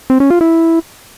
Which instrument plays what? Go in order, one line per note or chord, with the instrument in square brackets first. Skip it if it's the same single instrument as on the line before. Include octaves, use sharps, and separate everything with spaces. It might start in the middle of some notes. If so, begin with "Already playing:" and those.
[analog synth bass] C4
C#4
F4
E4